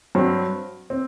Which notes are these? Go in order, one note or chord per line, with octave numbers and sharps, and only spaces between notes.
G2 F#3 C4
C4